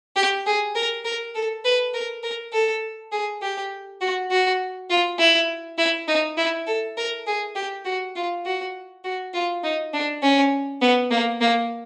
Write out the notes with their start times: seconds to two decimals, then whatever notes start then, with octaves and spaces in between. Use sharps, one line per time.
0.16 G4
0.46 G#4
0.75 A#4
1.04 A#4
1.35 A4
1.64 B4
1.94 A#4
2.23 A#4
2.53 A4
3.12 G#4
3.42 G4
4.01 F#4
4.31 F#4
4.90 F4
5.19 E4
5.78 E4
6.08 D#4
6.37 E4
6.67 A4
6.97 A#4
7.27 G#4
7.55 G4
7.85 F#4
8.15 F4
8.45 F#4
9.04 F#4
9.33 F4
9.63 D#4
9.93 D4
10.22 C#4
10.81 B3
11.10 A#3
11.41 A#3